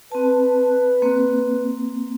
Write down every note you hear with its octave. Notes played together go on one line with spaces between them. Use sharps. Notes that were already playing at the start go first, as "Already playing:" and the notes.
C4 B4 A5
A#3 C4